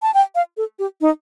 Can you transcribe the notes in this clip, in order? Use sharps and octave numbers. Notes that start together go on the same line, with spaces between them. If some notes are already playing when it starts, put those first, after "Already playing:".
A5
G5
F5
A4
G4
D#4